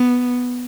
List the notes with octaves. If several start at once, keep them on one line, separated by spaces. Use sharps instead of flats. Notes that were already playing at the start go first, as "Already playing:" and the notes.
Already playing: B3